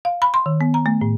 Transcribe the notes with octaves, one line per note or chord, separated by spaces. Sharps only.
F5
B5
C6
D#3
B3
A#5
A3
A2